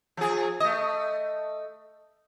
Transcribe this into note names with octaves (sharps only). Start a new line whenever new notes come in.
F3 G#4
A3 D#5